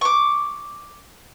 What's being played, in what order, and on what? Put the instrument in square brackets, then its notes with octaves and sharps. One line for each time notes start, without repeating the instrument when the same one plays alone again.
[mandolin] C#6 D6